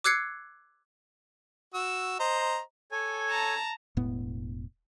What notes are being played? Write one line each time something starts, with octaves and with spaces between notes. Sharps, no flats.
D6 E6 F#6 G#6 C7 C#7
F#4 E6
C5 D#5 A#5
A4 C#5 G#5
A5 A#5
E1 A2 B3